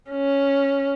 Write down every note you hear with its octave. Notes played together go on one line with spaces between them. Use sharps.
C#4